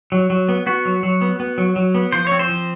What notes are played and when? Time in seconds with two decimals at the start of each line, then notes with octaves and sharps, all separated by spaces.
0.12 F#3
0.30 F#3
0.49 B3
0.66 B3 F#4
0.85 F#3
1.03 F#3
1.21 B3
1.40 B3
1.58 F#3
1.76 F#3
1.95 B3
2.12 F3 C5
2.27 C4 C#5
2.39 C5
2.49 F3